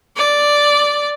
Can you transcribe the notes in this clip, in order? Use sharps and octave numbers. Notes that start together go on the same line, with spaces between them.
D5